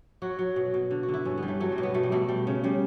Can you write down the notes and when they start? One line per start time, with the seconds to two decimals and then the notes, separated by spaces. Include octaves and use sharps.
0.22 F#3 F#4
0.39 F#3
0.56 B2
0.74 B2
0.91 D3
1.03 F#4
1.09 D3
1.14 E4
1.25 G2 C#4
1.38 G3 B3
1.48 A3
1.60 F#3 A3
1.72 G3
1.78 B2
1.83 B3
1.94 B2 A3
2.03 G3
2.12 B2 A3
2.29 G3
2.47 C#3
2.64 C#3 G3